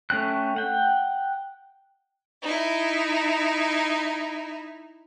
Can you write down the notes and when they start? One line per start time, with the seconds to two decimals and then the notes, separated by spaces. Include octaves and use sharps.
0.10 A3 C#4 G5 F#6
0.56 F#5 G5
2.42 D#4 E4